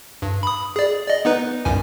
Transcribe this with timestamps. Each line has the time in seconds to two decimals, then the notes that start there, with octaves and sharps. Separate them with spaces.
0.22 G2
0.43 B5 D#6
0.76 G#4 D5
1.07 D5 D#5
1.25 B3 D#4 B4
1.65 C2 F#2 G#5